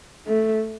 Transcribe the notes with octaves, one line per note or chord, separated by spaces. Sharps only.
A3